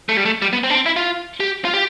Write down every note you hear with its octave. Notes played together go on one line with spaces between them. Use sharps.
A3
G3
A3
G3
B3
C4
D4
C4
E4
F4
G4
F4
G4